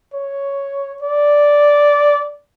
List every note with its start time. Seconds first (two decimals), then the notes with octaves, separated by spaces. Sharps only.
0.14 C#5
1.02 D5